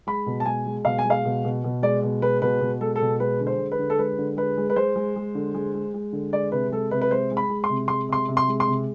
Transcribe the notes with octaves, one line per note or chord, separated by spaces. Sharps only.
G#3 B5
B2
A5
G#3 G#5
G#3
B2 F5
G#5
G#3 F5
B2
B2
B2
G#3 D5
B2
G#3 B4
B2 B4
B2
G#3 A4
A4
B2
G#3 B4
D3
C5
G#3
B4
D3
A4
G#3 B4
D3
G#3 B4
G#3
B4
G#3 C5
G#3
G#3
D3
G#3
G#3
G#3
D3
G#3 D5
C3 B4
G#3 A4
C3 B4
B4
G#3 C5
G#3
B5
G#3
C6
C3
G#3 C6
C3 C6
C3
C6
G#3
C6
C3